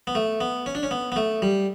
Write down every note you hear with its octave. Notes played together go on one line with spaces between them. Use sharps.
B3
A3
B3
C#4
D4
C#4
B3
B3
A3
G3